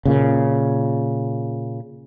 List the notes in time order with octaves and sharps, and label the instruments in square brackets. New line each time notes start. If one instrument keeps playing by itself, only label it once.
[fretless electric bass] A#2 C#3